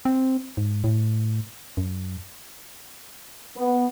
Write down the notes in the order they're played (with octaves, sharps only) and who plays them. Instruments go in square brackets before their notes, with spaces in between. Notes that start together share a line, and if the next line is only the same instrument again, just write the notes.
[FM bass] C4
G#2
A2
F#2
[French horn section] B3